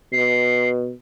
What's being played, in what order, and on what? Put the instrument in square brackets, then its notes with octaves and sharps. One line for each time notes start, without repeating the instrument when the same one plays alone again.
[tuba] B2 [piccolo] C7